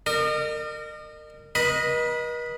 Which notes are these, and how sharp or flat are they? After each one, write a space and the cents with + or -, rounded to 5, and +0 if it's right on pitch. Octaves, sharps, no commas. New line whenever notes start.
A#4 -25 D#5 -40
B4 -45 D#5 +0 B5 +0